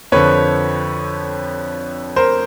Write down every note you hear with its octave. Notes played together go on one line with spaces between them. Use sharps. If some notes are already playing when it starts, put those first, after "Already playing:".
F2 D3 F3 B4 C#5
A#4 C5